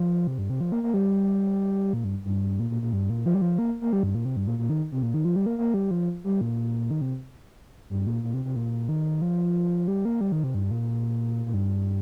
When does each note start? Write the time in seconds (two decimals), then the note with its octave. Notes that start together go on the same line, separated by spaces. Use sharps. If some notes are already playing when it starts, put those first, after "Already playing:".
Already playing: F3
0.27 C3
0.38 G2
0.50 C3
0.61 F3
0.72 A#3
0.83 A#3
0.94 G3
1.93 A#2
2.04 G2
2.25 G2
2.60 A#2
2.70 A#2
2.82 A#2
2.93 G2
3.10 A#2
3.26 F3
3.34 G3
3.42 F3
3.59 A#3
3.81 A#3
3.93 G3
4.03 G2
4.15 A#2
4.25 C3
4.37 G2
4.47 A#2
4.59 A#2
4.70 D#3
4.92 C3
5.03 A#2
5.14 D#3
5.25 F3
5.36 G3
5.46 A#3
5.58 A#3
5.74 G3
5.91 F3
6.24 G3
6.41 A#2
6.91 D#3
7.01 C3
7.90 G2
8.07 A#2
8.23 A#2
8.34 C3
8.45 C3
8.56 A#2
8.89 D#3
9.22 F3
9.88 G3
10.05 A#3
10.21 G3
10.32 D#3
10.44 C3
10.55 G2
10.71 A#2
11.46 A#2
11.54 G2